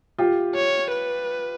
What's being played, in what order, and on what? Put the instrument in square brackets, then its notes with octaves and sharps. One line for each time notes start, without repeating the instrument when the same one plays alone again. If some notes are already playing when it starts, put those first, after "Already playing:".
[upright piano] F4 G4
[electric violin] C#5
B4